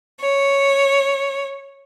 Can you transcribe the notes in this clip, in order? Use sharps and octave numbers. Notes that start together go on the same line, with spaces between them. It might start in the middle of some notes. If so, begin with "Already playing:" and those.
C#5